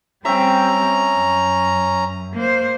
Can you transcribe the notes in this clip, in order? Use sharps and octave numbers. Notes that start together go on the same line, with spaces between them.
G3 C4 C#4 E5 G5 A#5
F#2
A#3 C5